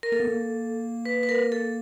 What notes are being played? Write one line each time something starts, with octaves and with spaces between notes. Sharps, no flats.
A#4
A#3 A4
B3
A#3
B4
B4
A#4
A4